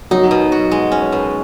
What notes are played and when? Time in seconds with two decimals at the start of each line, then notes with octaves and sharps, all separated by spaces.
0.11 F#3 D#4
0.31 B2
0.52 F#4
0.71 G#3
0.92 C#4
1.12 B2